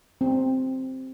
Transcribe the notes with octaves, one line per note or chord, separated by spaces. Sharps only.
C4